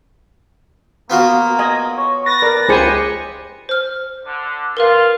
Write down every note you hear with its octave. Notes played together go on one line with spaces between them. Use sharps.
A#3 B3 F4 F#4
D#5 G#5
C#5
B4 A6 A#6
A#4 D5
C#2 G4 G#4 C5 G#5 B5 C#7
C5 F6
D3
F4 A#4 B4 F5